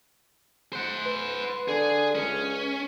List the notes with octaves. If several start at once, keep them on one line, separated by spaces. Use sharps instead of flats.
C5 F#5
B4
D3 G#4
C#2 C#4